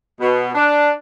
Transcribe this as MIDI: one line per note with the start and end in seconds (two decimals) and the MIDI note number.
0.20 0.49 47
0.55 0.91 62